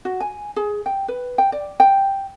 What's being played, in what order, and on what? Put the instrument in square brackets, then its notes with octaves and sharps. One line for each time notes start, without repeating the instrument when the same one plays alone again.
[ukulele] F#4
G#5
G#4
G5
B4
G5
D5
G5